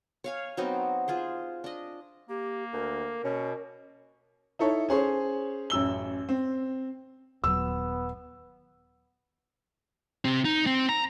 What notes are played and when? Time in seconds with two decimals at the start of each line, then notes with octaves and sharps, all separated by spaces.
0.24 C#5 F5 G#5
0.57 F#3 B3 C4 D#4
1.08 F4 G#4 C5
1.64 D4 D#5
2.29 A#3 G4
2.73 D2 A#4
3.24 B2 C#4
4.59 D#4 E4 A4 C#5
4.89 C#4 G#4 C5 C#5
5.70 A1 F#2 E6 G7
6.29 C4
7.44 D#1 F#3 B3 E6
10.25 C3 C4
10.45 D#4
10.66 C4
10.89 A#5